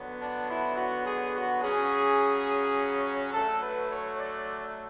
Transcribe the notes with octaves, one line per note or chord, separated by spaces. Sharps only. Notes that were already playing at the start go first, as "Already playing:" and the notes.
Already playing: D3 F#3 B3
D4
E4
F#4
G#4
F#4
C#3 F#3 C#4 G#4
D3 F#3 A3 A4
B4
C#5
D5